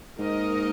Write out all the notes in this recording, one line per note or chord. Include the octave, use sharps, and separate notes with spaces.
G#2 A#3 D#4 A#4 D#5